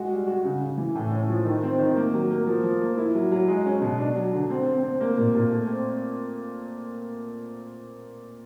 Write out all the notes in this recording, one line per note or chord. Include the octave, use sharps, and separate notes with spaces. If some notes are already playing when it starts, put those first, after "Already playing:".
Already playing: G#3 F#4
G3
F#4
C#3
C#3
E3
A2
C#4
F3
D#3
C4
D#3
A#3
F#3
A#3
F3
F3
A#3
E4
F#3
F#3
G#3
C#4
B2
D4
F#3
D3
C4
C4
C4
A#3
A#2
A#2
A3
C4